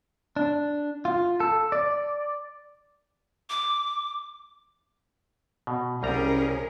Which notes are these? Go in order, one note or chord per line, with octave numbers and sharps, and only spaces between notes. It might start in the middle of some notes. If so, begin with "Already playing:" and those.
D4
F4
A4
D5
D6
B2
C2 G3 C#4 G#4 A#4 A#5